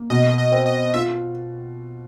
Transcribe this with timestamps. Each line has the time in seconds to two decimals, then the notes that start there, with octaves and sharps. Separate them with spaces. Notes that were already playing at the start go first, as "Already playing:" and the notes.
Already playing: A#3
0.10 B2 D#5
0.38 D#5
0.52 C4
0.66 D#5
0.94 F4 E5